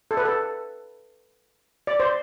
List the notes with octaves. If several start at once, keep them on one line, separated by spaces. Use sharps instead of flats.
A4
B4
A4
D5
C5